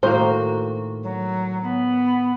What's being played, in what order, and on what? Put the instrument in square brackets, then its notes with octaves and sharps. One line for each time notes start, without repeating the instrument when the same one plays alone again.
[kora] A2 D#3 A#3 [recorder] F#4 [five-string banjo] C5
[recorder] F#3
B3